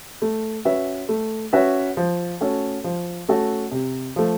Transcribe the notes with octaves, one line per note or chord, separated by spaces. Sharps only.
A3
C#4 F#4 B4 E5
A3
C#4 F#4 B4 E5
F3
A3 C#4 F#4 A4
F3
A3 C#4 F#4 A4
C3
F3 A3